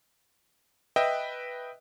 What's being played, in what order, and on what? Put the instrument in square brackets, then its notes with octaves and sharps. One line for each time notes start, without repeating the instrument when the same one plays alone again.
[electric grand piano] B4 D#5 E5 G5